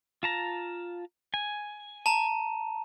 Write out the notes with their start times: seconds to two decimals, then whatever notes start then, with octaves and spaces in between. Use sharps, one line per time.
0.23 F4 A5 A#5
1.34 G#5
2.06 A5 A#5